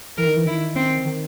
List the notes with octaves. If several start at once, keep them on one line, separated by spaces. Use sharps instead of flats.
E3 A#4
D#3
E3
D#3 E4
C4
D#3